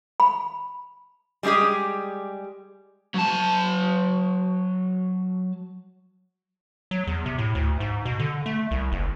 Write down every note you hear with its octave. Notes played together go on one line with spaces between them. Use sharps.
B5
G3 G#3 C#4 G4 G#4
F#3 A5
F#3
E2
C3
A2
D2
G#2
B2
D3
A3
C2
F#1